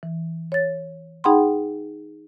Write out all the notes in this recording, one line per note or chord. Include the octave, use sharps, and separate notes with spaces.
E3
C#5 A6
D#4 G#4 F#5 G5 B5 C6